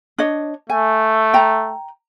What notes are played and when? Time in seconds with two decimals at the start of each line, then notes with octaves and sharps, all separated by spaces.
0.18 D4 C#5 D#5
0.70 A3 G#5
1.34 G5 A#5